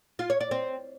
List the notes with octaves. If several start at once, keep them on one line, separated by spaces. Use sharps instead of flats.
F4
C#5
D5
C4